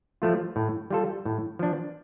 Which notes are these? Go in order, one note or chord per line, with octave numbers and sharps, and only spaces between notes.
F3 A3 F4
A2
G3 F4 A4
A2
F3 D4